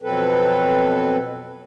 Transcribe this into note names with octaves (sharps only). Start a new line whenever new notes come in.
F2 B2 F#3 C4 A4 B4